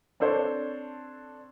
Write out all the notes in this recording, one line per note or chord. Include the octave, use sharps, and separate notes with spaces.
C4 D4 A4 C5 C#5